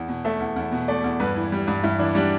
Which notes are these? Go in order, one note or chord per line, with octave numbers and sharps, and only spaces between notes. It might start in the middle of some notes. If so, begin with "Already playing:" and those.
Already playing: E2
B2
A3 E5
E2
E2
B2
A3 D5
E2
G2 B4
E3
G3
G2
G2 E4
E3 D4
G3 D4